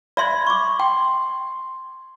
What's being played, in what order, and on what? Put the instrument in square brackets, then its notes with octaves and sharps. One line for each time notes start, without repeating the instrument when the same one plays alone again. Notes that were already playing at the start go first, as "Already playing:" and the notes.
[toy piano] D5 E5 C6 [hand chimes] B5 G#6
[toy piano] C#6 D6
[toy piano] G5 [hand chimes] C6